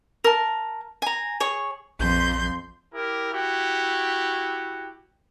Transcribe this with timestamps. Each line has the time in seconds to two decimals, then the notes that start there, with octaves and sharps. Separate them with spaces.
0.24 A#4 A5
1.02 G#5 A#5
1.40 G#4 C#5 C#6
2.00 A#1 F2 C6 G6
2.93 E4 G4 A#4
3.32 E4 F#4 G4